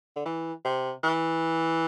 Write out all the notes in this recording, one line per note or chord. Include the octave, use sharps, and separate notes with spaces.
D3
E3
C3
E3